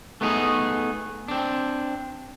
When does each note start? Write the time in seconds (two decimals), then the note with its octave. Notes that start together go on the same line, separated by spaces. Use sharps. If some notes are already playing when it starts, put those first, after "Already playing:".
0.21 A3 B3 D#4 G4 G#4
1.28 C4 D4